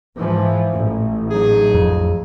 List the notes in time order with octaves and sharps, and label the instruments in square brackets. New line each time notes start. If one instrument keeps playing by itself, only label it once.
[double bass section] G#2 E3 F3
A1
[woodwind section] F#3 D#4 G#4
[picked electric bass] F2